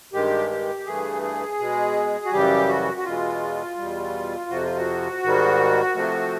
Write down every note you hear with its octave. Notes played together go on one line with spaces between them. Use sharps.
G2 D#3 G#3 G4
G4
G2 E3 A3 G#4
G#4
B2 G#3
F#4
F#2 C#3 E3 G3 G4
F#4
F#4
E2 B2 G#3 F4
E2 B2 G3
F2 C3 F3 F#4
F4
F#4
G#2 D#3 G3
C3 F3 A3